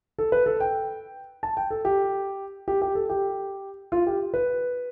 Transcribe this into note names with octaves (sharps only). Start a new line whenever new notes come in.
A4
B4
A4
G5
A5
G5
A4
G4
G4
G4
A4
G4
F4
G4
B4